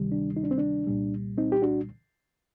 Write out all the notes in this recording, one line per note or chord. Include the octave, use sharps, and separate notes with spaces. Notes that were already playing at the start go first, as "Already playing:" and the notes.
Already playing: D2 C3 D#3 G3
D4
D#4
D4
C4
D4
C2 A#2 G3
C4 D#4
G4
D4 F#4